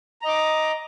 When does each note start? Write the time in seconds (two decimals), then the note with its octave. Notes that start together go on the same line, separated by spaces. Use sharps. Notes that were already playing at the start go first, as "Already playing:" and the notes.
0.22 A#5
0.25 D#5
0.28 D6